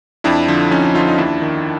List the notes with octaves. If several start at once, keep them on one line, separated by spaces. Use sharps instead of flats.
F2 D4 E4
D3 F3
F2 C#4 D#4
D3 F3 D#4 F4
D#4
D#2 D4 E4
D#3